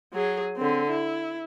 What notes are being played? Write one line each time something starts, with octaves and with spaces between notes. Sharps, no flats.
F#3 G#4
D3 C4
E4